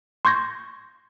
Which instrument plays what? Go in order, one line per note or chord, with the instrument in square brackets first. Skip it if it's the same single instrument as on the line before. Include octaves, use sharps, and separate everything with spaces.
[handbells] C6 C#6 G6 G#6 A#6